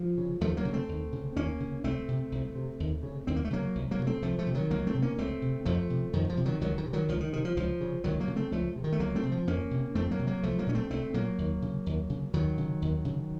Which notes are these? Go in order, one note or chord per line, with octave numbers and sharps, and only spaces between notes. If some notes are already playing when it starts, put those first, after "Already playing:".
Already playing: F3
C#3
D#2 F3 A3
F#3 A#3
C#3
A3 C4
D#2
C#3
D#2 A#3 C#4
C#3
C2 A3 C4
C3
C2
C3
D#2
C#3
D#2 C4
A#3
A3
C#3 F#3 A#3
C2
F#3 A#3
C3
A3 C4
C2 F3 A3
F3 A3
C3
D#3 F#3
C#2 F#3 A#3
A3 C4
C3
A#3 C#4
C#2 A3 C4
C3
F2 F3 A3
C3
F2 D#3
F3
C3
D#3 F#3
C#2 D#3 F#3
D#3
C3
D#3 F#3
C#2 F3
D#3
C3 D#3
F3
C#2 F3
C#3
C#2 D#3 F#3
F#3 A#3
C#3
A3 C4
C#2 F3 A3
C3
D#3
A3
C#2 F#3 A#3
A3 C4
C3
F3
F2 A#3 C#4
C3
F2 A3 C4
F#3 A#3
C3
F#3 A#3
C2 F3 A3
F#3 A#3
A#2 C#4
A3 C4
C2 A3 C4
A#2 F#3 A#3
D#2
C#3
D#2
C#3
D#2 D#3 F#3
C#3
D#2
C#3